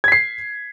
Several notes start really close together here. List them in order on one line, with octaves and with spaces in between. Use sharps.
G#6 B6 C7